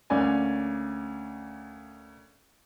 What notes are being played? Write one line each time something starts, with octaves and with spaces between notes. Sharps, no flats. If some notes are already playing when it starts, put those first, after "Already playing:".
D2 A#3 C#4 D5 G#5